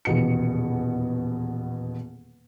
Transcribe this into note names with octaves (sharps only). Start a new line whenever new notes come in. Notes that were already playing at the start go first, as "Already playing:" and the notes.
D#1 E2 B2 C#7